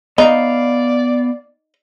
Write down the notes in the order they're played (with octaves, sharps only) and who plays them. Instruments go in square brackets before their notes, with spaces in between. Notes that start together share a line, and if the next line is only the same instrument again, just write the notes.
[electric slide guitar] B3 F5 [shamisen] D#4 [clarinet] D5